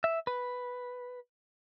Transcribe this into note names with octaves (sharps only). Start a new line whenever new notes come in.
E5
B4